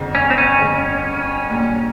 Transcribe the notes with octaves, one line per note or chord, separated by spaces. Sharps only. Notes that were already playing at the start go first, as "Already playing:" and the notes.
Already playing: G1 F2 C#3
C#4
C4
C#4
G1 F2 C#3
A#1 A#2 G3